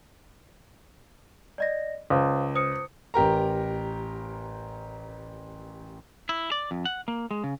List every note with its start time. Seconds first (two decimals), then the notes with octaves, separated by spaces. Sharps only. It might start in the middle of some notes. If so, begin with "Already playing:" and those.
1.58 D5 D#5 A#6
2.10 C#2 C5 F5
2.55 C5 D#6 C#7
3.14 A1 G4 A#4 A#5
6.29 E4
6.52 D5
6.71 F2
6.85 F#5
7.08 A#3
7.31 G#3
7.44 C#3